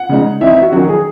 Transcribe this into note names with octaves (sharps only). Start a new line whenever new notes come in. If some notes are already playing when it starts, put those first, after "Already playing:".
Already playing: F#5
C#3 G#3 D#4
E3 C4 D#4 E5
E5
F#4
D#3 F#3 C#4 F#4
G#4